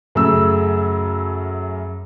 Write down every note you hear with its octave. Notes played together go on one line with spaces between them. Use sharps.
F#2 C#3 A3 E6